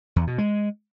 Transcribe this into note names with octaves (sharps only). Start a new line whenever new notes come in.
E2
B2
G#3